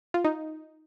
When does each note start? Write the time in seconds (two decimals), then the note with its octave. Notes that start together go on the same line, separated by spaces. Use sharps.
0.14 F4
0.25 D#4